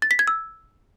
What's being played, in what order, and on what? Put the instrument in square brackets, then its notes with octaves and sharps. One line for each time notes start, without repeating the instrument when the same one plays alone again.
[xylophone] A6
B6
G#6
E6